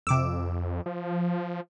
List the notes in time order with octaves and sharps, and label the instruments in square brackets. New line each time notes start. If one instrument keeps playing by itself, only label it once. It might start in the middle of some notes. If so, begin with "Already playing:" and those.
[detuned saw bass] F2 [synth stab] C3 D6 E6
[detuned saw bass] F3